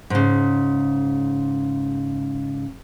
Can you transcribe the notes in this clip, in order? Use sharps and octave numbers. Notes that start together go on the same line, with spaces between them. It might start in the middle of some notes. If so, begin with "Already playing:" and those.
G#2 C#3